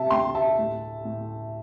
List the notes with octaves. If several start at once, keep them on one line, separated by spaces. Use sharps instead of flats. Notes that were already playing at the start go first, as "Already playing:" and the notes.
Already playing: C3 E5 A5
D2 G5 C6
E5 A5
A2
A2